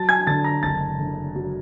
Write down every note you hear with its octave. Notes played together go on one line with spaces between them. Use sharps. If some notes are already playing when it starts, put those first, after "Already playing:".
Already playing: F#3 A5 A6
G#5 G#6
D3 A5 A6
A#5 A#6
F#1 A5 A6
D3
F#3